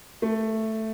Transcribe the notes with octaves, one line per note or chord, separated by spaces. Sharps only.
A3